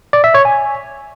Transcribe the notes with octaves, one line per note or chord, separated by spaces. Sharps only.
D5
E5
C#5
G#5